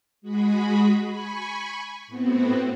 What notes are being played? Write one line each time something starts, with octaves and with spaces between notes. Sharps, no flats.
G#3 F#4 G#4 B5
G#5 B5 C#6
A2 B3 C4 F#4